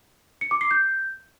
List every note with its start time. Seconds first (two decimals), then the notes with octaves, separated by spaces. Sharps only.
0.41 C#7
0.51 D6
0.61 C7
0.71 G6